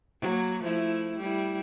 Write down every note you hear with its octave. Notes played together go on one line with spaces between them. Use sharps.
F#3 A#3
F3 A3 E4
G3 E4